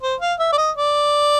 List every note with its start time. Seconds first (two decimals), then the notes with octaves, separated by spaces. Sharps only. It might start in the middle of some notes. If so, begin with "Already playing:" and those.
0.02 C5
0.21 F5
0.39 E5
0.52 D5
0.58 D#5
0.76 D5